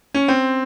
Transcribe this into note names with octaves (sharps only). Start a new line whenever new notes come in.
C#4
C4